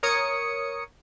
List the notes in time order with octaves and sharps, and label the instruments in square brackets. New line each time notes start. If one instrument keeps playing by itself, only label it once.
[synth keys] A#4 C#5 D#6 C#7